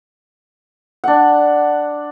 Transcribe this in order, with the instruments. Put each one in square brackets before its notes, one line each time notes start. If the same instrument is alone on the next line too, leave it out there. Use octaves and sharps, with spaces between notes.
[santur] D4 F#5